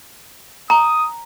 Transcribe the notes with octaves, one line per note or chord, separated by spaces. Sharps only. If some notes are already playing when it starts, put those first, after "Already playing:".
A#5 D#6